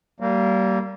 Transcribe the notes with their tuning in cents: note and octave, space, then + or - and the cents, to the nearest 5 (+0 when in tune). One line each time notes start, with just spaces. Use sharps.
G3 -30 A#3 -15